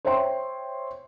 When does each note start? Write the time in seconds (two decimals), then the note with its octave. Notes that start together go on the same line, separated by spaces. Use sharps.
0.05 C5 C#5 E5 G5 C6